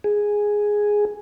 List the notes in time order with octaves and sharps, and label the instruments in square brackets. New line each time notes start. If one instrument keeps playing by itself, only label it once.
[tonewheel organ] G#4